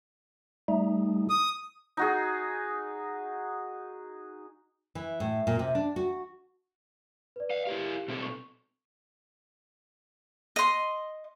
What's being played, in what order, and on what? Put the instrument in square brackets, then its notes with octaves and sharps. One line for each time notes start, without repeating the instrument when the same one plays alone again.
[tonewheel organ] G3 A3 D#4
[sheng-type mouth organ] D#6
[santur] D#4 F#4 G#4
[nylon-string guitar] E3
A2
A#2
C3
D4
F#4
[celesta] B4 D5
[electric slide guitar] D#5 F5
[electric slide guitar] E4 A#4 F5 [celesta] G4
[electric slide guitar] B2 C4 A4
[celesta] C#6
[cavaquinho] D#5 C6